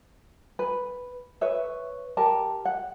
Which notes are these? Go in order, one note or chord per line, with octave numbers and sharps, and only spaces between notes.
B4
B4 C#5 E5
G4 A#4 A5
F#5